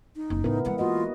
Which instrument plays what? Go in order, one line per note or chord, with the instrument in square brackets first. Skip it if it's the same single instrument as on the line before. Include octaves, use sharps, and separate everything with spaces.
[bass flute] D#4
[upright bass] F#1 F2
[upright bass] A2 C#3 [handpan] B3 E4 A#4
[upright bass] E3 G#3 [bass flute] F#5
[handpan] A#3 F#4 D#5 [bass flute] F4